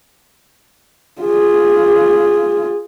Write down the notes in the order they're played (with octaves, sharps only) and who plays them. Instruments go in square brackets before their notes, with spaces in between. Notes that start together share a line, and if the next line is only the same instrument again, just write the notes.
[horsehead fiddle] F4 G#4